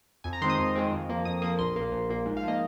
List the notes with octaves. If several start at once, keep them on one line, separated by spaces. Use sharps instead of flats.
F2 G#5
A#5
D#3 G#3 C4 C6
D#6
F2
D#3 G#3 C4
F2
F3 A#3
F2 D#6
F3 A#3 D#6
A#1 C6
A#2 A#3
A#1
A#2 A#3
G#2
F5
F3 A#3 D#5